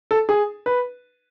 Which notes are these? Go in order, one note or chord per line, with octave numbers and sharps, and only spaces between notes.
A4
G#4
B4